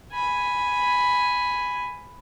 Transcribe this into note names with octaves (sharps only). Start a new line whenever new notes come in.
G#5 B5